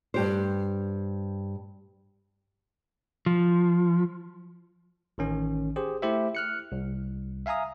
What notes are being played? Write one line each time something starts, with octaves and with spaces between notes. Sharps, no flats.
G2 G4 C5
F3
A1 D#3 C#4
G4 G#4 C5
A3 E4 G4 C5 E5
F6 F#6 C#7
C2
E5 F5 G#5 A#5 D#6